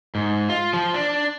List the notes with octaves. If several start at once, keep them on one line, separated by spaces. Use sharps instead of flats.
G#2
F4
F3
D4